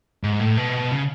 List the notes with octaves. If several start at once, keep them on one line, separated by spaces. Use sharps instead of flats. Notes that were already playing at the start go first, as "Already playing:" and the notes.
G#2
A2
B2
C#3